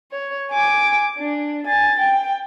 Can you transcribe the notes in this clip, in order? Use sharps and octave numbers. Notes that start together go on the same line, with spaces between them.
C#5
G#5 D6
D4
G#5 A6
G5